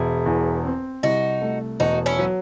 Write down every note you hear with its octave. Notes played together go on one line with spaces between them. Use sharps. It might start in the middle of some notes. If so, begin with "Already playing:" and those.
Already playing: E1 E4 G#4
E2
C4
C2 D#4 F#4
A3
E1 D#4 F#4
C#4 E4
F#3